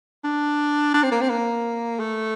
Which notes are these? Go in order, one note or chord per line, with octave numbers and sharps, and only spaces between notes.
D4
D4
C4
A#3
C4
A#3
A3